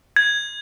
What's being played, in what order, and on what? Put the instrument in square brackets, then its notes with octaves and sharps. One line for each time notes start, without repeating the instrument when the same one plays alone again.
[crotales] G#6